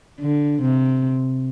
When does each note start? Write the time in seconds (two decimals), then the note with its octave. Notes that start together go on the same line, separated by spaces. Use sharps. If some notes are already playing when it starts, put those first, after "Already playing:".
0.20 D3
0.62 C3